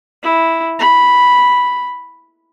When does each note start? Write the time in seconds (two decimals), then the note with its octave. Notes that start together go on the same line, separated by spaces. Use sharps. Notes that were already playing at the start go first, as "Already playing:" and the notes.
0.23 E4
0.79 B5